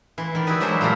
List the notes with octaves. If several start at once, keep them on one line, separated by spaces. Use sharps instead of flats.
E3 C6
D#3 D5
E4 F#4 G4 B4 D#5
E3 F#3 G#3 D4 C5 E5
A#2 A3 F4 G4 A#5